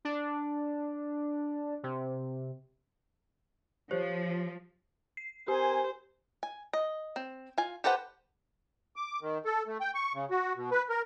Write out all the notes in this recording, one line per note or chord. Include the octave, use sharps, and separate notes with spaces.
D4
C3
F3 G4 C5 C#5
C7
C4 G4 A#4 C5 G#5
G#5
D#5
C4
F4 G#5
G4 A4 B4 C5 F#5
D6
D#3
A4
A3
G5
C#6
C#3
F#4
B2
B4
A#4